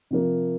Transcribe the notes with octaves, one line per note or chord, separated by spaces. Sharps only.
C3 F3 A#3